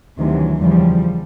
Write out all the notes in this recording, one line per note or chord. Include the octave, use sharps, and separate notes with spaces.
D2 C3 D#3 E3 F#3
E2 C#3 E3 F3 G3